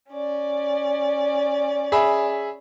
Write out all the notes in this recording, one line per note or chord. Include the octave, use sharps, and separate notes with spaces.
C#4 D5
G#4 E5 B5